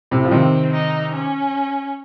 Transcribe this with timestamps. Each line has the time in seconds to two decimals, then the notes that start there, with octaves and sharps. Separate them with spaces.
0.11 A2 C3
0.24 F3
0.31 C3 D#3 C4
0.73 D#4
1.14 C#4